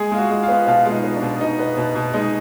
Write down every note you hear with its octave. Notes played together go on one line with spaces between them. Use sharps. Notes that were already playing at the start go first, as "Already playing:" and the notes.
Already playing: G#3 G#4
G#3 F4
F#4
G#3
F4
B3
B2 F4
G#3 F4
D#4
B3
D4
B2
B2 D#4
B3
B2
B2
G#3 D#4